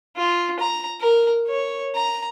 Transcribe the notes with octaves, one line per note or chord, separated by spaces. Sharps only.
F4
A#5
A#4
C#5
A#5